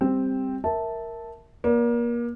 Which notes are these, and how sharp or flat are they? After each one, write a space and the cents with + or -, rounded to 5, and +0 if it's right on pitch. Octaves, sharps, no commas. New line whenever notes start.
G3 +15 C4 +0
A#4 +0 E5 -15 A5 +0
A#3 +30 D5 -25